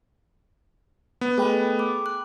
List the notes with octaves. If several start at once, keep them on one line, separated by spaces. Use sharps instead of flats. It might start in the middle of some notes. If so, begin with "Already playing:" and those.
B3
A3 G#4 A4 G5 B5
D6
F#6